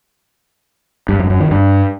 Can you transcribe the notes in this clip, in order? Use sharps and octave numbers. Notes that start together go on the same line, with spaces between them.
G2
F#2
F#2
D#3
G2